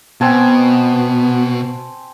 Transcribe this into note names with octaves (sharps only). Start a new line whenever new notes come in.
B2 B3 C4 G#5 A5